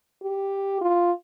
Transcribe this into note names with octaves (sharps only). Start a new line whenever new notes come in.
G4
F4